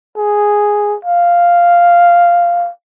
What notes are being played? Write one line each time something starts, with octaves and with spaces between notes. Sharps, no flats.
G#4
F5